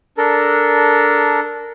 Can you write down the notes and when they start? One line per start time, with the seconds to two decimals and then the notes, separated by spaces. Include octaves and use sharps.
0.18 D4 A4 A#4